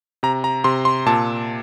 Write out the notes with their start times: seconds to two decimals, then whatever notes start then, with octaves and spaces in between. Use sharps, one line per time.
0.23 C3 A#5
0.44 A#5
0.64 C3 C6
0.85 C6
1.06 A#2 A5